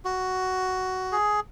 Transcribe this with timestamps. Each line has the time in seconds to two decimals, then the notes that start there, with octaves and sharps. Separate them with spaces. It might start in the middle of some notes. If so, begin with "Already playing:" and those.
0.05 F#4
1.12 G#4